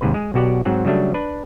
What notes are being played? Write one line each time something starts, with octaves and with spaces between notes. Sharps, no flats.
D#2 G#2 C3 B4
G#3 G#4
B1 B2 F#4 G4 D5 F#5
G#2 F#3 C4 F#5
C#3 F#3 G3 A3 D4
D4 B4